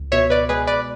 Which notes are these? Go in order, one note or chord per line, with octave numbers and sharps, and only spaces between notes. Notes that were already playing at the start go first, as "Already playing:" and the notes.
Already playing: C#2
B2 C#5 E5
B4 D5
G#3 G#4 B4
B4 D5